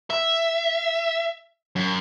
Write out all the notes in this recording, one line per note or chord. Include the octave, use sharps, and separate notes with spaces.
E5
F#2